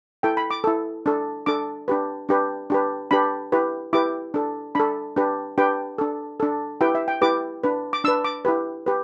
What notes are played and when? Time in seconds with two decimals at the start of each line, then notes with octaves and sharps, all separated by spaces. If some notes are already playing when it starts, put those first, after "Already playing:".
0.23 E4 A4 G5
0.37 B5
0.51 D6
0.64 E4 A4
1.06 D4 A4
1.46 D4 A4 D6
1.88 D4 G4 B4
2.29 D4 G4 B4
2.70 D4 G4 B4
3.11 D4 G4 B4 B5
3.52 E4 G4 B4
3.93 E4 G4 B4 D6
4.34 D4 A4
4.75 D4 A4 B5
5.16 D4 G4 B4
5.58 D4 G4 B4 G5
5.98 D4 A4
6.40 D4 A4
6.81 E4 G4 B4 G5
6.95 E5
7.08 G5
7.22 E4 G4 B4 D6
7.64 D4 B4
7.93 D6
8.04 D4 B4 E6
8.25 D6
8.45 E4 G4 B4
8.86 G4 B4